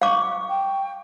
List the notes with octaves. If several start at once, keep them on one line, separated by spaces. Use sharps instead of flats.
F5 C#6 D6
G5